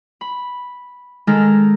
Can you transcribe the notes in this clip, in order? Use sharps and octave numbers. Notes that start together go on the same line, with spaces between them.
B5
D#3 G#3 D#4 A4 A#5 F6